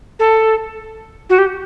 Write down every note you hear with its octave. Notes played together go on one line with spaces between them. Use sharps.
A4
F#4
G4